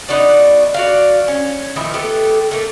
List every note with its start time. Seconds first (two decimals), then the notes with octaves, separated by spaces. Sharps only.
0.09 B3 D#4 F#4 D5
0.74 F#4 D5 F5
1.28 C#4
1.76 A#2 D#3 F3 E4
1.93 A3 B3 G4 A4
2.51 A3 A#3